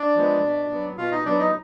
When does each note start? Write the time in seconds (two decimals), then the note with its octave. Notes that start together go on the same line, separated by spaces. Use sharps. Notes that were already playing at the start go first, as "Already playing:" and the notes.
Already playing: D4 D5
0.16 F3 G#3 B3
0.44 B2
0.71 F#3 B3
0.98 B2 F4 F5
1.12 D#4 D#5
1.25 F#3 B3 D4 D5
1.39 D#4 D#5